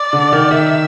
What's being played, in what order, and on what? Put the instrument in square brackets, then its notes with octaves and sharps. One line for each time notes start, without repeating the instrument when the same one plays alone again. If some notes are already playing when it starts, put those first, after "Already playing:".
Already playing: [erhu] D5
[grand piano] D3
D#3
[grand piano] D#3 [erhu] E5